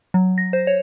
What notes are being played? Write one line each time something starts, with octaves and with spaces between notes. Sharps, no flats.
F#3
A#6
C5
C#5